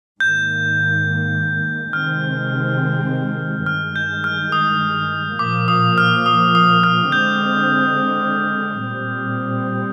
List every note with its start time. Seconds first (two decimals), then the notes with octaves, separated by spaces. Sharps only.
0.20 G#2 D#3 A#3 G6
1.93 C3 D#3 G#3 C4 F6
3.66 G2 D#3 G#3 F6
3.96 G6
4.24 F6
4.52 D#6
5.39 A#2 F3 A#3 D6
5.68 D#6
5.98 F6
6.26 D#6
6.55 D#6
6.84 F6
7.12 D3 G#3 C4 G6
8.85 A#2 G3 C4